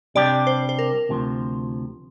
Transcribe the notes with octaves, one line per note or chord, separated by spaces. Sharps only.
C3 G3 D4 G4 D5
C5
C5
A#4
D2 C3 F3